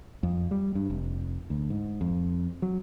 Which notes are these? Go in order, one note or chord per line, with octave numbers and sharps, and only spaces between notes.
F2
G3
G2
F1
D2
G#2
F2
F#3